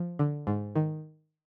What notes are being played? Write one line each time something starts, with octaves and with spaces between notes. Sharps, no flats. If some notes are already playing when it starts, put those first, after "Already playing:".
Already playing: F3
D3
G#2
D#3